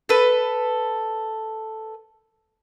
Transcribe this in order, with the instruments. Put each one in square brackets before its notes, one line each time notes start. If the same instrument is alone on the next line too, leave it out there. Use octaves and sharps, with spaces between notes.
[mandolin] A4 B4